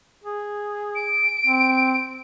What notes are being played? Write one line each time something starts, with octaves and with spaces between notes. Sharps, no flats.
G#4
D7
C4